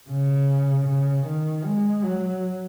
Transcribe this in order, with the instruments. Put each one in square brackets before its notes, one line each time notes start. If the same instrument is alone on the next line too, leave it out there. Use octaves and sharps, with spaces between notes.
[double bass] C#3
C#3
D#3
G#3
F#3